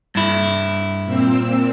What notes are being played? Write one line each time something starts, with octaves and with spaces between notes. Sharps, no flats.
G2 E4
A#2 C4 E6